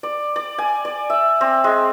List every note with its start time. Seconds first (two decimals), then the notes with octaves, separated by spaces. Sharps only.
0.03 D5
0.36 D5
0.58 G#5
0.85 D5
1.10 E5
1.41 C4
1.64 G#3